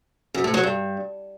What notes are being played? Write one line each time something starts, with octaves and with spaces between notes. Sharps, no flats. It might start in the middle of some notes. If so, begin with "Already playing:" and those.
F#2
A2
F#3
G2